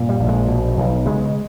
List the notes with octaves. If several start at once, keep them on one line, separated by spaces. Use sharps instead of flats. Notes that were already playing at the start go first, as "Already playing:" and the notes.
Already playing: G2 A#2
G3
A#1
G#3
B2
B1
C#3 G#3